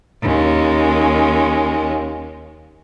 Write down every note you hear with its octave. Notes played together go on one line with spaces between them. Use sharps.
D#2 G#3 C#4